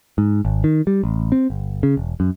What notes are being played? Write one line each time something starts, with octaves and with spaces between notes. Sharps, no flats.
G#2
G#1
D#3
G3
A1
C4
G1
C#3
E1
F#2